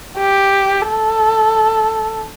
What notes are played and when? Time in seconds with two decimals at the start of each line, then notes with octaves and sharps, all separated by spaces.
0.18 G4
0.87 A4